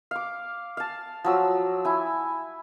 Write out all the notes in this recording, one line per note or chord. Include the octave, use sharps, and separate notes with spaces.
F5 D6
F5 A5
F3 F#3 E6
E4 G#5